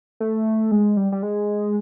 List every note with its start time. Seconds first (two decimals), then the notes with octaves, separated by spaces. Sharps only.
0.20 A3
0.71 G#3
0.97 G3
1.12 G3
1.23 G#3